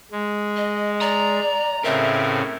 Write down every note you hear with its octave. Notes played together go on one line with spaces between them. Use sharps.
G#3
D#5
D5 A#5
A2 C#3 C4 A#4 E5